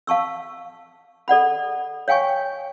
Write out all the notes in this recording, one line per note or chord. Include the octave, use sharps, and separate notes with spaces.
F5 A5 C#6 E6
A4 D5 F#5 B5
C#5 F5 G5 G#5 C#6